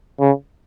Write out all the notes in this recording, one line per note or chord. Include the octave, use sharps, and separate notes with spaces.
C#3